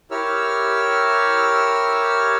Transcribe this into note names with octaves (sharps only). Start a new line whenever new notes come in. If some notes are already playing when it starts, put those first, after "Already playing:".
E4 G4 A#4 C#5 E6 F6